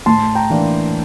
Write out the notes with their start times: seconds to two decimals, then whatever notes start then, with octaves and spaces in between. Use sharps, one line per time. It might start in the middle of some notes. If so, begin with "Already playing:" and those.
0.06 A2 A5 C6
0.35 G5 A#5
0.50 E3 A#3 D4